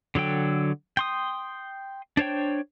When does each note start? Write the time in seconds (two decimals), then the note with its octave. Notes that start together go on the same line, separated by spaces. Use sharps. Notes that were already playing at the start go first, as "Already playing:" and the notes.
0.15 D3 F#3 A4 G5
0.97 G5 C6 D#6
2.17 D4 C5 C#5 G5